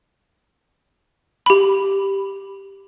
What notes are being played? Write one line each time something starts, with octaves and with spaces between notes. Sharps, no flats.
G4 B5